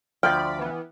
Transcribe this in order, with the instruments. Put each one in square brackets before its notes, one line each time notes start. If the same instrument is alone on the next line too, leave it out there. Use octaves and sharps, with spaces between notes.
[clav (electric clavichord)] D2 F3 [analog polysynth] D5 B5 [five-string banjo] G5 [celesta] F6
[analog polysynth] E3 B3